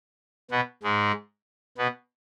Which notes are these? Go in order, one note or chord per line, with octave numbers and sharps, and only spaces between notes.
B2 B3
G#2 G#3
B2 B3